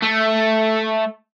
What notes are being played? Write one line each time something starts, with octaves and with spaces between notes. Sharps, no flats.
A3